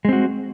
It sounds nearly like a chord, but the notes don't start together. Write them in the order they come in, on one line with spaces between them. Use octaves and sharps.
G#3 C4 F#4